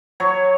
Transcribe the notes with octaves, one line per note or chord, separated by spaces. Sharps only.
F#3 C#5